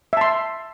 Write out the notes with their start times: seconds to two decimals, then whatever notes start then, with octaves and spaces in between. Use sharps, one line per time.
0.13 E5
0.17 A5
0.21 C6